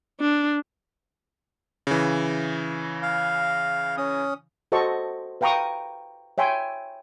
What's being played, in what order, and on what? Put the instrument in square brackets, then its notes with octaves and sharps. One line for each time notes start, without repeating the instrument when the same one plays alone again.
[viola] D4
[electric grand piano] C#3 E3
[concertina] F5
C#4 D#6
[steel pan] F#4 A4 C5 D#5 A5 C#6
B4 F5 G5 A#5 C#6 D#6
C#5 E5 G5 G#5 C6